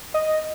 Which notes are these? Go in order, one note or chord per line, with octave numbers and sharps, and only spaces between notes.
D#5